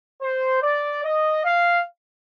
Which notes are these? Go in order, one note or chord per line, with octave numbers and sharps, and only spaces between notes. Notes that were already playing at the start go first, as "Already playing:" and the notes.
C5
D5
D#5
F5